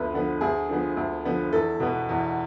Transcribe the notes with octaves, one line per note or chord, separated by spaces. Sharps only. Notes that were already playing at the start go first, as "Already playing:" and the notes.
Already playing: D2 D3 F3 B3 B4
D3 F3 B3
D2 G#4
D3 F3 B3
D2
D3 F3 B3
E2 A4
B2 B3
E2